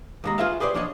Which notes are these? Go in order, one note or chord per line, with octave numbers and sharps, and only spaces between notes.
D#2 G#3 A#5
F4 G#4 B4 E5 F5
G4 G#4 B4 C5 D5
F3 D4 C#5 D#5